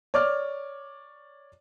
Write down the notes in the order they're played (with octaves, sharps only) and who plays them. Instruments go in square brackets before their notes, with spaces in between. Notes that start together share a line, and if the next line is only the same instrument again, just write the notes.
[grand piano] C#5 D5 D6 F6